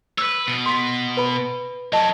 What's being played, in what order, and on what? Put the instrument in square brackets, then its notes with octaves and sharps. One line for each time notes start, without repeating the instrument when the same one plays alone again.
[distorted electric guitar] B4 C#5 [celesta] E6
[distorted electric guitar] B2
[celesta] C6 B6
B4 B5
[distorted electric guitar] F#3 C#4 [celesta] D#5 A5